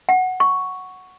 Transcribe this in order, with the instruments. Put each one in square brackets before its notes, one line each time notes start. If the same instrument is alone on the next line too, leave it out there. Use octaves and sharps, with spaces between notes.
[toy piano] F#5
C#6